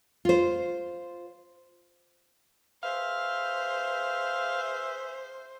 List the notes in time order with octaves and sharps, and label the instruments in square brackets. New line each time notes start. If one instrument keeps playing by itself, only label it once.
[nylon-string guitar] F4 C5
[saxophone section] G#4 B4 E5 [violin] C5 [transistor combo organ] F5